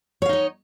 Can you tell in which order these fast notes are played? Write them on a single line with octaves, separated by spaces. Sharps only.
C#5 F5 D#4 D#5